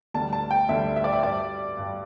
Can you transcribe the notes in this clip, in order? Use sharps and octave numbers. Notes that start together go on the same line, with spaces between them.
D2 D3 G3 A5
A5
G5
D2 D3 G3 E5
E5
D5
E5
G2 G3 D5
G2 G3